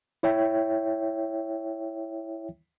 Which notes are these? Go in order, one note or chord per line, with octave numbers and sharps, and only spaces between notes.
E4 C#5 E5 G5